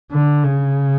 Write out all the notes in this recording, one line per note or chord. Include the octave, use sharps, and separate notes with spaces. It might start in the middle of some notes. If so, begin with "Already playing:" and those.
D3
C#3